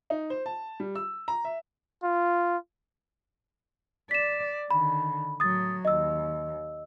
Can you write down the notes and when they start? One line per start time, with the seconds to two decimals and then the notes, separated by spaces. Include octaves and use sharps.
0.10 D#4
0.30 C5
0.46 A5
0.80 G3
0.95 E6
1.28 A#5
1.45 E5
2.03 F4
4.11 D5 B6 E7
4.71 D3 D#3 B5
5.40 A2 F#3 D#6 A6
5.85 D#2 D#5 E6